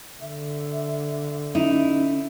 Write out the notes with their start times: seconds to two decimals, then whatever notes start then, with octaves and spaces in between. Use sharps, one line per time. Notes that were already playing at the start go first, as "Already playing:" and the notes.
0.21 D3 E5
1.55 C#4 D#4 E4